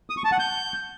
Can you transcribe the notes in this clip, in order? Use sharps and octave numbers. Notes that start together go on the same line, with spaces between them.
D#6
C#6
A5
F#5
G6